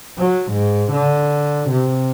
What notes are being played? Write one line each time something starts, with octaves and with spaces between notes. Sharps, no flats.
F#3
G#2
D3
C3